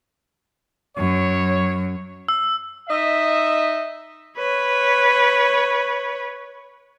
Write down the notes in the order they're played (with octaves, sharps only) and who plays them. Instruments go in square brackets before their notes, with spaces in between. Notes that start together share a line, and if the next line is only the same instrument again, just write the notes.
[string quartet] F#2 [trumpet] C#5
[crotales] E6
[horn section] D#4 D#5 E5
[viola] B4 C#5